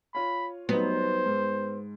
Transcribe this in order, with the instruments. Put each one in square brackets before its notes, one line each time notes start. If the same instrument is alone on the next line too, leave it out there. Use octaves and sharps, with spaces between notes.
[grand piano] F4 C#5 [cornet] B5
[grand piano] F#3 G3 D#4 [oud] B3 [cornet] C5
[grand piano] G#2